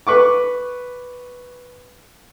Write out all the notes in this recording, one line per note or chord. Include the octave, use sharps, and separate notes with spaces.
B4 C#6 D6